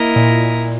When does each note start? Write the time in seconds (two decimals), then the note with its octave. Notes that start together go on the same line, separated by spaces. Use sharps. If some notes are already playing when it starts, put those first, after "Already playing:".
Already playing: A#3 E4 A#4 D#5
0.16 A#2